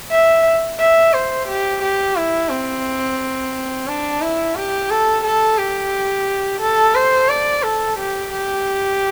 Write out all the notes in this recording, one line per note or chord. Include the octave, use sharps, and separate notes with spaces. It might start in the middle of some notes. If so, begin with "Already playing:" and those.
E5
E5
C5
G4
G4
E4
C4
D4
E4
G4
A4
A4
G4
A4
C5
D5
A4
G4
G4